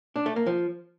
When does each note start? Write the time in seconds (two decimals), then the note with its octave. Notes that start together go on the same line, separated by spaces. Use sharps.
0.16 D4
0.26 A3
0.36 A#3
0.47 F3